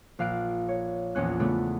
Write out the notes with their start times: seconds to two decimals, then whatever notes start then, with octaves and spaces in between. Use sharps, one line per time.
0.19 A#1 F5 F#6 D7
0.68 C#5
1.15 A#1 E2 C#4 F#6
1.40 C#3 A3 B3 D4